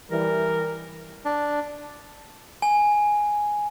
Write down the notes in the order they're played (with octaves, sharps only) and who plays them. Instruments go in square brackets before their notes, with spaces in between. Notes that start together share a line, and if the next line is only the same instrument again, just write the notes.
[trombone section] E3 G3 [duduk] A#4
[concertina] D4
[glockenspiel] G#5